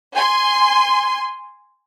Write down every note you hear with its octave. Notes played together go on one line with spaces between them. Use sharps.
G#5 C6